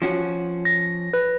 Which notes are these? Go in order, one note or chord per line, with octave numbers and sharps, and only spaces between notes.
F3 C#4 F#4
A#6
B4